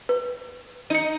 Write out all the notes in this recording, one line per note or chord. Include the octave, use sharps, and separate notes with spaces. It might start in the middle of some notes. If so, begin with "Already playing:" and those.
B4
D#4 C#7 D#7